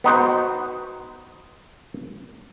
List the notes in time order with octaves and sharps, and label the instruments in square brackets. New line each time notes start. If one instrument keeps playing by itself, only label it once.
[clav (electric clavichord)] B3 D#4 F#4 C5